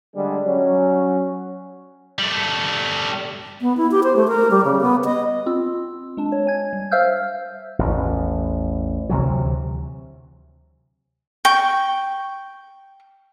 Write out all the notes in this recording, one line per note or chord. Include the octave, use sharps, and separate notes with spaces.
D3 G3 G#3 D4
F#3 C#4
G3 A3
B3
E4
G4
C5
A3
A#4
G3
C#3
B3
D#5
C4 F4 E6
G#3 D4 A5
C#5
G#5 G#6
G3
C5 E5 F5 E6 F6 G6
A1 E2
D2 C3 E3 F#3
G5 C#6